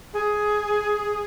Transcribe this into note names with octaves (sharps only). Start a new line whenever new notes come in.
G#4